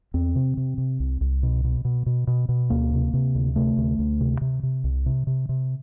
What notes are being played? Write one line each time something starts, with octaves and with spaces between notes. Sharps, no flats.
E2 C4
C3
C3
C3
C2
C2
B2
B2
B2
B2
B2
B2
D2 A#3
C3
C3
D2
C3 A3
D2
D2
C3
C3
C3
C2
C3
C3
C3